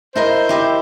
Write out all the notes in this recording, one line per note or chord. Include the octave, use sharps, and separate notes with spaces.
E4 A#4 C5 D#5
E4 G4 D#5